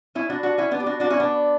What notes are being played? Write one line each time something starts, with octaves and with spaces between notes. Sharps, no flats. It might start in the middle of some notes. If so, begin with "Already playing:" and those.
C#4 E4
D4 F#4
D4 F#4
C#4 E4
B3 D4
G4
D4 F#4
D4 F#4
C#4 E4
B3 D4